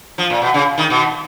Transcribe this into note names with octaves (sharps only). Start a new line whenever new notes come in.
F3
A#2
B2
C#3
D#3
B2